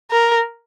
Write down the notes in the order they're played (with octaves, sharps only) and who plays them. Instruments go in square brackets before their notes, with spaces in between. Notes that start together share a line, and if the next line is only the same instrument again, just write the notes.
[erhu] A#4